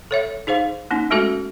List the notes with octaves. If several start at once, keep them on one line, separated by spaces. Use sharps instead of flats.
A4 C#5 E5
D#4 G#4 C5 F5
A#3 C#4 D#4
G#3 A3 C#4 F#4 A4 E5